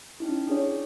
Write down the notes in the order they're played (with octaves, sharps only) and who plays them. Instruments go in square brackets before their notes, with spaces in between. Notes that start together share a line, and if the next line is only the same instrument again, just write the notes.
[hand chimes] C#4 D#4 E4
D4 G#4 C#5